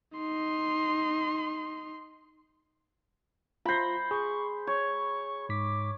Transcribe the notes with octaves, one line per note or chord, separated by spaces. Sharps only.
D#4 C6
F4 C5 B5 A#6
G#4 C#6
C#5 C#6
G#2 D6 B6